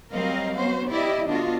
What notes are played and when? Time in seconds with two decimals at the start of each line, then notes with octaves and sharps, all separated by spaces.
0.12 F#3 G3 C4 A#4 D#5 F5
0.56 B3 C#4 F#4 C5
0.89 E4 G4 D5 D#5
1.29 D3 B3 D4 F4 F#4 D#5